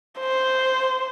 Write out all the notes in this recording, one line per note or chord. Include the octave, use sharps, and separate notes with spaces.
C5